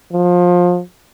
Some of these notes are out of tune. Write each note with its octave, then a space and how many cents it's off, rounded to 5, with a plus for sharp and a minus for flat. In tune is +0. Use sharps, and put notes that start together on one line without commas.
F3 +25